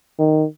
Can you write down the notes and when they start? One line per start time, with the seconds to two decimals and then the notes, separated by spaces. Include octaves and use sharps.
0.19 D#3